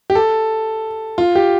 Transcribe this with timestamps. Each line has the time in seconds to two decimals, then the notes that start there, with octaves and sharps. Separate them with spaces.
0.10 G4
0.15 A4
1.18 F4
1.35 G4